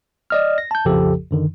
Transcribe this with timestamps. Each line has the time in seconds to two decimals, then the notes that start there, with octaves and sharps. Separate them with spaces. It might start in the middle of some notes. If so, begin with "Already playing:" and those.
0.30 D5 D#5 F6
0.58 A#6
0.71 A5 G6
0.85 A#1 F2 C#3 F3 G4 A4
1.31 F#2 D3 D#3